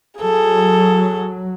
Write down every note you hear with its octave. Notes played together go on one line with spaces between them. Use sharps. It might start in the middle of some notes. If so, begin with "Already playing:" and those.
F#3 G#4 A4